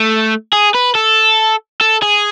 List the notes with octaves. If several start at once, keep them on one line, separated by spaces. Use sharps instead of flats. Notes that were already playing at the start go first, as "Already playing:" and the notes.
Already playing: A3
G#4
B4
A4
A4
G#4